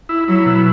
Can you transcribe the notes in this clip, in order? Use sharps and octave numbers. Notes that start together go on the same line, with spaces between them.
E4
F#3 E4
B2